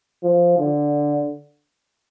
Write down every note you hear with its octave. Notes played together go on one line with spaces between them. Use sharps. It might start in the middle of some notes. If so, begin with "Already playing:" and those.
F3
D3